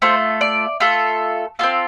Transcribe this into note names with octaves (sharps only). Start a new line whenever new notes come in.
A3 F4 A4 C5
D5
A3 F4 A4
C4 F4 A4 F5